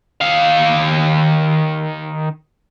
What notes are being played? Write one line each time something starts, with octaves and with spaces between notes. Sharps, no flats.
D#3 F5